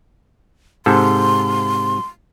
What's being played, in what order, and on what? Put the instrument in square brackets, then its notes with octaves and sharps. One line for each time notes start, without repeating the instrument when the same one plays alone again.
[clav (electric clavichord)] G#2 C3 A4 [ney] C6